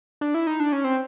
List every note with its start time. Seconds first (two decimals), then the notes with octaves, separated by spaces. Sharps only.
0.21 D4
0.34 E4
0.47 D#4
0.60 D4
0.73 C#4
0.84 C4